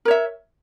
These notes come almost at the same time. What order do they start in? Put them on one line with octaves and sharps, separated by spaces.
A#4 C#5 E5